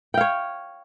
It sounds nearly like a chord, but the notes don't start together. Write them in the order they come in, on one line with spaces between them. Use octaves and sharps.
G5 F5 C#5